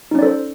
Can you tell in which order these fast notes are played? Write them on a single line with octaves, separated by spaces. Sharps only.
D#4 C#4 D5 A4 C5